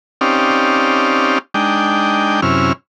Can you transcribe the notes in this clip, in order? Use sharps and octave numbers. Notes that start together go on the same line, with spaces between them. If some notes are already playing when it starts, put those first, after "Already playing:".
C4 C#4 D#4 G4 D5 F5
G#3 D4 D#4 G5
F#2 C3 C#4 E4 F6